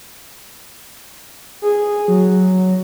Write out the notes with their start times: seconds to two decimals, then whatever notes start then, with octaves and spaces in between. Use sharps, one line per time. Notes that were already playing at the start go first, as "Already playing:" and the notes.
1.62 G#4
2.08 F#3